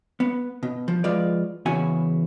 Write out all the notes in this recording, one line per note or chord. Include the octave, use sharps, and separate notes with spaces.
B3
B2
F3
F3 G#3 F4 B4 D5
E2 C#3 E4 F#4 G#5